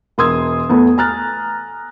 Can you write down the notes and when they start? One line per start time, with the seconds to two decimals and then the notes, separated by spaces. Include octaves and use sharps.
0.18 E1 A#4 C6 D#6 E6 G#6
0.69 E2 A3 B3
0.98 G#5 A#5 F6 F#6 A6